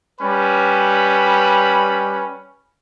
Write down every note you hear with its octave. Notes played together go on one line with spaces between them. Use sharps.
G3 C#4 B4 B5